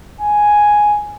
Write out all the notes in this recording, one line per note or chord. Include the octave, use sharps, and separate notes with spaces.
G#5